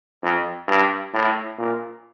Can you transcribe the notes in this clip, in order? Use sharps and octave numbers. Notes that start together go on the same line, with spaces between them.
F2
G2
A2
A#2